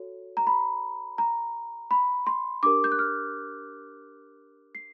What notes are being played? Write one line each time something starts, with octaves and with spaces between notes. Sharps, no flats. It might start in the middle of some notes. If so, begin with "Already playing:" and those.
Already playing: F#4 A4 C#5
A#5
B5
A#5
B5
C6
D4 G4 A#4 D6
G6
F#6
F6
C7